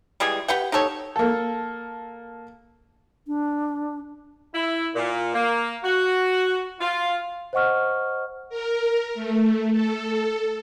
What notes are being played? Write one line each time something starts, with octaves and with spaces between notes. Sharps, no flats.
E3 G3 G#3 G#4
G4 B4 F#5 G5
D#4 G4 A4 C#5
A#3 A4
D4
E4
A#2
A#3
F#4
F4
C5 D#5 F#5 C#6 F6
A#4
A3
A4